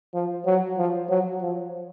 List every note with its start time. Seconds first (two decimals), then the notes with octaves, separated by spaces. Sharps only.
0.14 F3
0.46 F#3
0.78 F3
1.10 F#3
1.41 F3